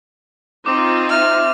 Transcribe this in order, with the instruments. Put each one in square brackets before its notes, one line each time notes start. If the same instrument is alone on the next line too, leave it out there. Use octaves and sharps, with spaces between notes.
[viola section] C4 D#4 F4 [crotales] D6
[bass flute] E5 [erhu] F6